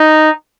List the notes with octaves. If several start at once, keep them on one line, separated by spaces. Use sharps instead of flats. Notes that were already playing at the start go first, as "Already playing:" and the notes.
Already playing: D#4